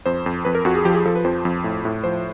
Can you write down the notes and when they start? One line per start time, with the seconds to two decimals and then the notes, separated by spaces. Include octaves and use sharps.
0.06 F2 C5
0.26 F2
0.45 F2 B4
0.55 A#4
0.65 F2 F#4
0.75 G#4
0.85 F3 G4
0.94 G#4
1.06 F3 A4
1.15 B4
1.24 F2 C5
1.45 F2
1.64 A2
1.85 A2
2.04 F3 C5